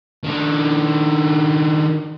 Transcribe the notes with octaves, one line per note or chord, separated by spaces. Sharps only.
D#3 D4